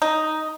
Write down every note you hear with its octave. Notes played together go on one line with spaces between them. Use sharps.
D#4